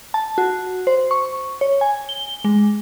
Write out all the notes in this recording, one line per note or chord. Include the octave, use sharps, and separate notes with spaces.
A5
F#4
C5
C#6
C#5
G#5
G7
G#3